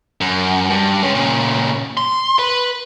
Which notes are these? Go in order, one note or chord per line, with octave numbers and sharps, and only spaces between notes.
F#2
G2
G#3 C#4
A#2 C#3
C6
B4